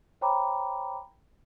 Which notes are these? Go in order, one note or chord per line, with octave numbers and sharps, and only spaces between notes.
C5 C#5 G5 A#5 B5 D6